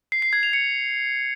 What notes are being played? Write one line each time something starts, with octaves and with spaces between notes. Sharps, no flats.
C7
C7
G#6
F7
C#7